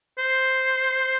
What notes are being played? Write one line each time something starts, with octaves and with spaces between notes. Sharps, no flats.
C5